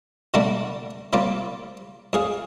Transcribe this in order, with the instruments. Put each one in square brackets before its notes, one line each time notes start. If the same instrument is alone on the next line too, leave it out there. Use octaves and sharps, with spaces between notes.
[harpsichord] B2 D3 G3 A3 A#3 D4
C3 G3 A#3 F4 D5
F2 G#4 F5